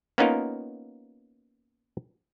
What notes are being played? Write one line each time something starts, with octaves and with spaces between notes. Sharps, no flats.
A#3 B3 C#4 D#4 F4 A#4